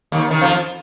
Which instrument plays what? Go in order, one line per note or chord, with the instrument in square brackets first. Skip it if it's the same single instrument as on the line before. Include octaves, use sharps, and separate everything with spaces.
[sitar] D#2 D#3
D#3
F2 F3